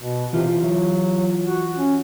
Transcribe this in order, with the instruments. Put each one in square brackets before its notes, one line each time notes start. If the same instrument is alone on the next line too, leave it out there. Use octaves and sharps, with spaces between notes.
[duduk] B2
[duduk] C3 [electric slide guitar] E3 F4 G4
[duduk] F#3
F#4
C#4